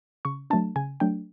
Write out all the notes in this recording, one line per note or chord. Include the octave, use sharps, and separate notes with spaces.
C#3 C#6
F#3 A3 D4 A5
C#3 G#5
F#3 A3 D4 G5